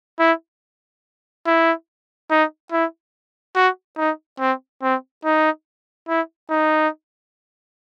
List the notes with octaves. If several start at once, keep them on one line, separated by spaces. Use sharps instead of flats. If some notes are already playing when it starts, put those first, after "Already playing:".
E4
E4
D#4
E4
F#4
D#4
C4
C4
D#4
E4
D#4